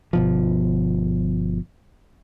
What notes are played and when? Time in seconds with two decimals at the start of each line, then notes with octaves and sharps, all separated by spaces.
0.13 G1 B2 F3